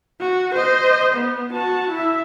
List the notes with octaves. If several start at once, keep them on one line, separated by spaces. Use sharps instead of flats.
F#4
C5 D#5
B3
F#4 A5
E4 E5